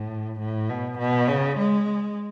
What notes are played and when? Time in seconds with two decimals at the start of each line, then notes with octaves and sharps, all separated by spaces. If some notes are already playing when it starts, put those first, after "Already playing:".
Already playing: A2
0.40 A2
0.70 B2
0.98 B2
1.28 C#3
1.58 G#3